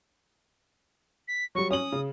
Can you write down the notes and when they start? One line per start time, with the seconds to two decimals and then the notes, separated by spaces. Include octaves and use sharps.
1.28 B6
1.55 F#3 G3 C#6
1.71 C#4 D#6 F#7
1.92 C#3